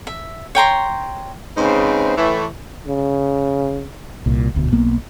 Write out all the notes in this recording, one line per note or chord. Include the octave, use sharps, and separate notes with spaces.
E5
C#5 G5 A#5 C6
G#2 C#3 C4 D#4 B4 C5
A2 E3 A3
C#3
C2 A#2
D#1 D2 B2
B1 A#3 B3